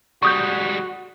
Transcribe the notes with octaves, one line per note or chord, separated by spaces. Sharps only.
G3 G#3 F#4 C#6 D#6 G6